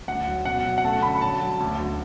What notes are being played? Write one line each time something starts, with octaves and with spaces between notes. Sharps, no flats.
D2 F#5
F#3
B2 F#5
F#3
F#5
A3 A5
D3 B5
F#3 A5
F#3
D2
D2